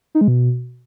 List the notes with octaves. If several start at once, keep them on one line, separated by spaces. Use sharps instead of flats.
D#4
G#3
B2